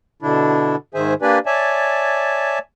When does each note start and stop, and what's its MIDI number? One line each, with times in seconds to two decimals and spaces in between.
0.22 0.76 47
0.22 0.76 50
0.22 0.76 62
0.22 0.76 64
0.94 1.14 44
0.94 1.14 51
0.94 1.14 68
0.94 1.14 72
0.94 1.14 76
0.94 1.14 80
1.22 1.39 58
1.22 1.39 62
1.22 1.39 67
1.22 1.39 71
1.22 1.39 74
1.22 1.39 80
1.46 2.59 73
1.46 2.59 74
1.46 2.59 76
1.46 2.59 80
1.46 2.59 81